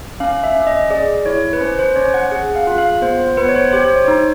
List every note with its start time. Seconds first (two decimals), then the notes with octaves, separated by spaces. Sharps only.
0.20 C#4 F5
0.44 E5
0.55 C#4
0.67 D#5
0.90 G#4 D5
1.26 E4 C#5
1.53 B4
1.61 C#4 C5
1.79 C5
1.96 C#4 C#5
2.14 F#5
2.31 G#4 F#5
2.56 F5
2.67 F4
2.78 F5
3.02 B3 C5
3.20 C5
3.37 B3 B4
3.49 C#5
3.55 C5
3.72 G4 C5
3.85 C5
3.96 C#5
4.08 D#4